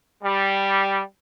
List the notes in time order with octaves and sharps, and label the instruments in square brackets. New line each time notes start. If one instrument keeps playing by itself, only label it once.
[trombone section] G3